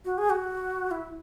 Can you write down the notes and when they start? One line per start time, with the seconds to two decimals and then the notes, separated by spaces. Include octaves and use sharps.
0.05 F#4
0.18 G#4
0.30 F#4
0.91 E4